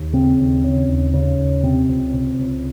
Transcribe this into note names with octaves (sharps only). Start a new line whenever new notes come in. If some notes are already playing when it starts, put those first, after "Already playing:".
Already playing: D#2
C#3 C4
D#2
C#3
D#2
C#3
D#2
C3 C4
C#2
C3
C#2